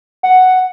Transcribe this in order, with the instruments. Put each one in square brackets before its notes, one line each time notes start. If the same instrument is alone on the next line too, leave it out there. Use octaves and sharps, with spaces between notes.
[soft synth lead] F#5